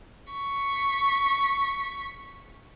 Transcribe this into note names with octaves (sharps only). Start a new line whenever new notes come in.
C#6 B6